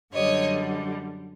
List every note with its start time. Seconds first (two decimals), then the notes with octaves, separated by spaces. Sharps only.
0.13 F#2 D3 G3 C#5 D#5